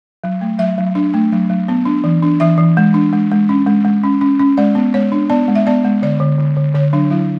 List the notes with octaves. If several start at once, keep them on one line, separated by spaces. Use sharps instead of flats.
F#3
A3
F#3 E5
F#3
D4
A3
F#3
F#3
B3
D4
E3
D4
E3 E5
E3
G#3
D4
G#3
G#3
C#4
G#3
G#3
C#4
C#4
C#4
G#3 D5
B3
G#3 C#5
D4
B3 D5
G#3
E5
B3 D5
G#3
D3 D5
D3
D3
D3
D3 C#5
F#3 D4
F#3 E4